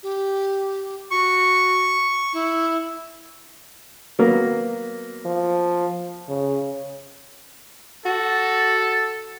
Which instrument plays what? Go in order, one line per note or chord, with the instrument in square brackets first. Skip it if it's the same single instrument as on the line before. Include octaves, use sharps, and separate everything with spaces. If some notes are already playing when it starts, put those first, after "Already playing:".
[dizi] G4
[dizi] F#4 [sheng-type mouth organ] C#6
[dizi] E4
[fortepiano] F#3 A#3 B3
[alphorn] F3
C#3
[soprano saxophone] F#4 [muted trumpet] A4